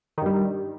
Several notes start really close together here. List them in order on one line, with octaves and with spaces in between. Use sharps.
D#3 G2 G3